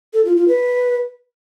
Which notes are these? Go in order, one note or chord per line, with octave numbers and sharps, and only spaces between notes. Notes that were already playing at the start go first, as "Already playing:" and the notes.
A4
F4
F4
B4